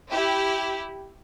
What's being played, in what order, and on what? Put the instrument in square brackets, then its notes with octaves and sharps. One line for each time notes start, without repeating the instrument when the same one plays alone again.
[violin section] E4 G4